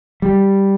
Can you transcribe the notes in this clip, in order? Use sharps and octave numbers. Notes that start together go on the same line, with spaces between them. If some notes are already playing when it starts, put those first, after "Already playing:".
G3